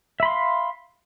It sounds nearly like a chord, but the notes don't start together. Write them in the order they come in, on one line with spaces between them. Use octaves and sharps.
E5 B5 C6 F5